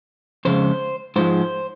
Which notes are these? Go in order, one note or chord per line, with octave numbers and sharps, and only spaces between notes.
F2 C#3 G#3 C5
G#2 F3 G#3 C5